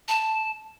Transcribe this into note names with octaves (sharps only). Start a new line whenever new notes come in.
A5